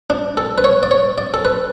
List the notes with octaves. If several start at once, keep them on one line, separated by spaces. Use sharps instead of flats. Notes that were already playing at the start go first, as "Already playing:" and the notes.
D4
A4
B4
C#5
D5
C#5
D5
A4
B4